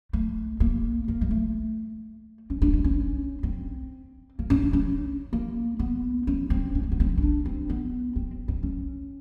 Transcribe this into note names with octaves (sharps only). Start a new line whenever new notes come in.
A3
A#3
A#3
G#3
A3
C#4
D4
D4
C#4
C4
A#3
C#4
D4
C#4
A#3
B3
C#4
C4
C#4
C4
B3
C4
C#4
D4
C4
B3
C4
C4
C#4